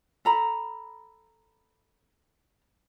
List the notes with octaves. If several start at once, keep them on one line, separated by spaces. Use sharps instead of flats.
A4 A#5 B5